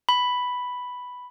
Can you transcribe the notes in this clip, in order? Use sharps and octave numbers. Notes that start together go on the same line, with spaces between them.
B5